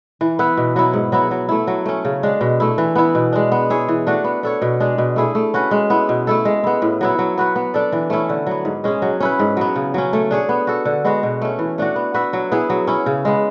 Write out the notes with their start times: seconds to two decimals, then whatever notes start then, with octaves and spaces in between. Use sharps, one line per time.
0.21 E3
0.39 B3 E4 B4
0.57 B2
0.76 F#3 B3 E4
0.93 G#2
1.12 F#3 B3 E4
1.31 F#3
1.49 A3 E4
1.67 F#3
1.86 A3 C#4
2.05 C#3
2.23 G#3 D4
2.41 B2
2.60 A3 E4
2.78 E3
2.95 B3 E4
3.15 B2
3.33 G#3 D4
3.52 B3
3.70 E4 G#4 C#5
3.89 E3
4.06 A3 D4 F#4
4.24 B3
4.43 D4 A4 C#5
4.62 B2
4.80 G#3 D4 G#4
4.98 B2
5.16 A3 E4 G#4
5.35 A3
5.54 C#4 F#4 B4
5.71 G#3
5.90 B3 E4
6.09 B2
6.27 A3 E4 A4
6.45 G#3
6.64 B3 E4
6.82 A2
7.01 F#3 B3 E4
7.19 F#3
7.37 B3 F#4 B4
7.56 B3
7.74 D4 A4 D5
7.92 E3
8.10 A3 C#4 E4
8.29 D3
8.46 F#3 B3
8.65 G#2
8.84 G#3 C#4 G#4
9.02 F#3
9.20 C#4 E4 B4
9.39 G#2
9.57 F#3 B3
9.76 C#3
9.94 F#3 C#4
10.13 A3
10.31 D4 G#4 C#5
10.49 B3
10.67 F#4 A4
10.85 D3
11.05 G#3 B3 F#4
11.23 B2
11.42 A3 C#4
11.59 E3
11.78 A3 D4 F#4
11.96 B3
12.14 F#4 B4 E5
12.33 F#3
12.51 B3 E4 G#4
12.70 F#3
12.87 C#4 E4
13.06 C#3
13.25 G#3 B3